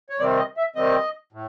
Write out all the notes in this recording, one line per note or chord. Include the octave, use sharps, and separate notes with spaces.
C#5
C3 D#3 G3 C4 D5
D#5
E5
C3 D#3 G3 C4 D#5
A2